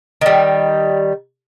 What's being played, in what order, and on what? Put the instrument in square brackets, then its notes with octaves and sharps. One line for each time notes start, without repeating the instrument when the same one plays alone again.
[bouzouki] D#3 G3